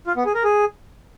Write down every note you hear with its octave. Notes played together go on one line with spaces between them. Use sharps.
F4
B3
G#4
A#4
G#4